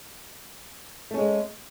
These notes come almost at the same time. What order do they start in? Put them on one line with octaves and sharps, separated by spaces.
A3 C#4 G#3